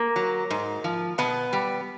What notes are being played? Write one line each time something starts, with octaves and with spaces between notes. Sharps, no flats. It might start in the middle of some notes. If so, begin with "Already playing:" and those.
Already playing: A#3
F#3
G#2
F3
B2 B3
G3